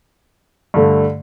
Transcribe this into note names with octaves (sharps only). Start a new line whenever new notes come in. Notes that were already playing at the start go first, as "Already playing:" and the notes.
G2 D3 A3